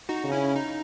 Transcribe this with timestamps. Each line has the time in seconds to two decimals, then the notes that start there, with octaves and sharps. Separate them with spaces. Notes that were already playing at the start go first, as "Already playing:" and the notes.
0.09 D#4 F#4
0.24 C#3
0.32 C#4 E4
0.56 D#4